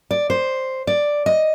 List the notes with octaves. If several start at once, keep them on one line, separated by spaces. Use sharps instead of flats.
D5
C5
D5
D#5